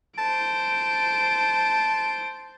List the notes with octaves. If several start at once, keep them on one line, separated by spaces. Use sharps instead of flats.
C5 A5 D7